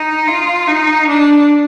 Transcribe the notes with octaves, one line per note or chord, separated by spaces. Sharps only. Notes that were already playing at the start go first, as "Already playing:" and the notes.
Already playing: D#4
F4
D#4
D4